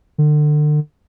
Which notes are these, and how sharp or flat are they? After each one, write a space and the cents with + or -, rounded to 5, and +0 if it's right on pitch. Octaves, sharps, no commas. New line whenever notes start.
D3 +35